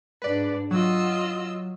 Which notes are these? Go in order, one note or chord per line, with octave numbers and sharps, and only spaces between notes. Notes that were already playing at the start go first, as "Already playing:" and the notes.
G#2 D4 B4 D5
F#3 F4 D#5 E6